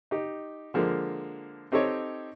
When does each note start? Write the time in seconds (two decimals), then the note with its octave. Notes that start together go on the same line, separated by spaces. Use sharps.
0.11 D#4 G4
0.74 D3 F3 G#3 A#3
1.72 C4 D#4 G4 A4 C5 C#5